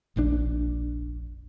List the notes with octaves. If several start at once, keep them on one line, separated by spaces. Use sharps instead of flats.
F1 A#1 A2 D4